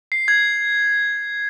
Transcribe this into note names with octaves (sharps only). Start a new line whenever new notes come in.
C7
G#6